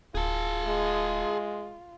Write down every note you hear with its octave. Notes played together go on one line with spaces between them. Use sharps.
D1 F4 G#4 A5
G#3